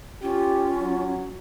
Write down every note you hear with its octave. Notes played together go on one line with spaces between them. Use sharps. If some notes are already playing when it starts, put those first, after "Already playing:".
C#4 F4 G4
F#3